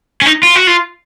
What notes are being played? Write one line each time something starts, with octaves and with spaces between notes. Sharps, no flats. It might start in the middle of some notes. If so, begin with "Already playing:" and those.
C#4
D#4
F4
F#4
F4